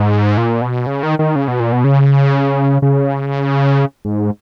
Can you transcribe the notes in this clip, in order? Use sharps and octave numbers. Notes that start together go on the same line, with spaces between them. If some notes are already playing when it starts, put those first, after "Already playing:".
Already playing: G#2
A#2
B2
C#3
D#3
D#3
C#3
B2
A#2
B2
C#3
C#3
G#2